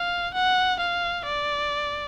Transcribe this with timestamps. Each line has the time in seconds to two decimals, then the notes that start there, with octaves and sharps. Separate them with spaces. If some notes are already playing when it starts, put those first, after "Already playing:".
Already playing: F5
0.34 F#5
0.80 F5
1.25 D5